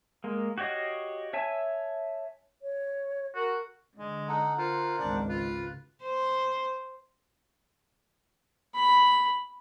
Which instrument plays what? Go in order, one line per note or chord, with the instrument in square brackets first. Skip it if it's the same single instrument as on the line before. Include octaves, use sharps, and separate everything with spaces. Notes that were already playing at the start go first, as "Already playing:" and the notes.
[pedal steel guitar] G#3 A#3
F#4 G4 C#5 D#5 F5
C#5 E5 G#5 A5
[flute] C#5
[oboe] F#4 [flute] A#4
[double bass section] D3 [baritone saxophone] G#3
[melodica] D#4 A4 F#5
[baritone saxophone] F4 [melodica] A#4 C5 F#5
[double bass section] G#1 C#2 [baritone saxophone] D4
[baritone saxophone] F4 [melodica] B4
[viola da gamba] C5
[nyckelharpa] B5